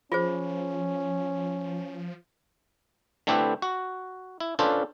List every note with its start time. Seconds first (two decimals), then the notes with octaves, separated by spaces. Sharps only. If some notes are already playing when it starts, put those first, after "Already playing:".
0.12 F3 C#4 F4 G#4 C5
3.27 D3 A3 C4 E4 G4 B4
3.62 F#4
4.40 E4
4.59 C#4 D4 F4 A4 B4 C5